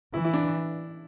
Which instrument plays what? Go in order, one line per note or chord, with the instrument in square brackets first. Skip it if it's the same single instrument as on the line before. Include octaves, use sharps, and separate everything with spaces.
[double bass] E3 [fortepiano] E4
[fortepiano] E4
D4